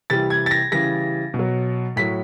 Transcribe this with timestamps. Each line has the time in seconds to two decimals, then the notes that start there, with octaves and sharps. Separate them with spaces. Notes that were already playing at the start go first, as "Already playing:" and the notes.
0.10 C3 E3 G3 A6
0.30 G#6
0.46 A6
0.51 A#6
0.71 C#3 E3 G3 A#6
1.34 B2
1.39 F#3
1.96 A2 F#3 B6